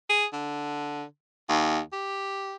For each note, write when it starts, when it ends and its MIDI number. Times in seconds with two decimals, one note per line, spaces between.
0.09 0.25 68
0.33 1.04 50
1.49 1.80 39
1.93 2.55 67